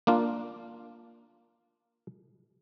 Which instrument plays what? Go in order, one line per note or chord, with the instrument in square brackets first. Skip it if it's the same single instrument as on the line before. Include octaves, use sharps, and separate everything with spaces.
[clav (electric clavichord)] A#3 D4 F4